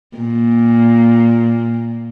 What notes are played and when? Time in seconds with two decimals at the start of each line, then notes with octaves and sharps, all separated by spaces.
0.17 A#2